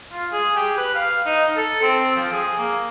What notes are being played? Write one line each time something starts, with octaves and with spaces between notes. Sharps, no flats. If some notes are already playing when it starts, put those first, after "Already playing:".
F4
G#4
G4
B4
F5
D#4
A4
C4
F3
G#4
A#3